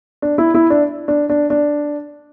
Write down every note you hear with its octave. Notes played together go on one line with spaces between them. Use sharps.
D4
E4
E4
D4
D4
D4
D4